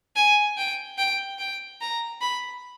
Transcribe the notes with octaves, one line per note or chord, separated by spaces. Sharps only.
G#5
G5
G5
G5
A#5
B5